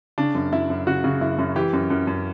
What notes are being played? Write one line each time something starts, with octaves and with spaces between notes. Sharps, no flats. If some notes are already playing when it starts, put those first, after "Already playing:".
C#3 D4
F#2
F#2 E4
F#2
C#3 F#4
C#3
F#2 E4
F#2
E3 G4
F#2
F#2
F#2